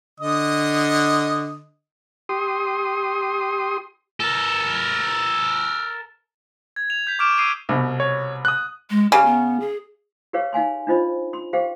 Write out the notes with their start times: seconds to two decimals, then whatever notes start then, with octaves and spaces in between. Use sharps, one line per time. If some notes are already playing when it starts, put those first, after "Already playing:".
0.20 D3 D#5 D#6
2.29 G4 C6 D#6
4.20 A4 A#4
6.76 G#6
6.90 F7
7.07 G6 B6
7.19 C#6 D6 F6 D7 E7
7.38 D#6 E6 C7 D7 D#7 F7
7.69 C2 B2
8.00 C#5
8.45 D#6 F#6
8.90 G#3
9.12 C#3 G4
9.25 B3
9.60 G#4
10.33 G4 G#4 B4 C#5 F5
10.53 D#4 F5 G#5 C6
10.87 D4 D#4 F4 C5 D#5 B5
11.33 C6
11.53 G4 G#4 C5 F5 G5